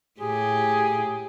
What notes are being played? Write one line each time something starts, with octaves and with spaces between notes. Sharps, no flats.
A2 G4 G#4